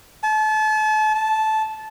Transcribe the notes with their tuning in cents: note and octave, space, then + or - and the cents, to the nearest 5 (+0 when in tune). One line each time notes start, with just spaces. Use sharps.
A5 -35
A5 -15